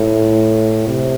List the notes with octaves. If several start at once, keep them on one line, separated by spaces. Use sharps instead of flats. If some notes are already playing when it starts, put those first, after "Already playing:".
Already playing: A2
C3